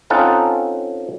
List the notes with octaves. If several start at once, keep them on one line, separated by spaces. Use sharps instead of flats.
C4 C#4 D#4 F4 A4 F#5